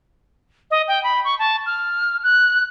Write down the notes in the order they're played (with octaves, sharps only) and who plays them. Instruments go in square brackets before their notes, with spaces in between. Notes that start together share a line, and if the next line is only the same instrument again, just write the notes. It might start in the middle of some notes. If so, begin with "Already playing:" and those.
[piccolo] D#5
G5
B5
C#6
A5
F6
F#6